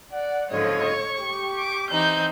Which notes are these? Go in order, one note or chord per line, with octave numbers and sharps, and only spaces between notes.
D5 F#5
F#1 G#2 D3 F3 F4 C#5 D#5
C#6
G4
D6
E3 C4 D#4 G6